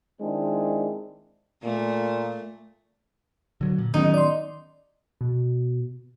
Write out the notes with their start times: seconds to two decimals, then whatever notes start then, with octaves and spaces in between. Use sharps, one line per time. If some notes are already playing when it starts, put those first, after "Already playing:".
0.21 D#3 G#3 C4 D4 E4
1.64 A#2 A3
3.61 D3 F#3
3.78 A#2
3.94 A1 D#3 F#3 B3 C#4 D#4
4.14 D5 C6
5.21 B2